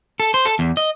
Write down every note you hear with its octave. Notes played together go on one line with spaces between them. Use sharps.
A4
C5
A4
E2
D#5